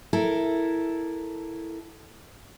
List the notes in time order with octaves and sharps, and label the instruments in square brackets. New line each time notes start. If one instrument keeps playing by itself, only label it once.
[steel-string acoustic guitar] E4 A4 A#4